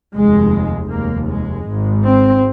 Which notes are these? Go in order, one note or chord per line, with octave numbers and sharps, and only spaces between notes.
F1 D#2 G#3
F1 D#2 A#3
G#3
G#1 G#2
C4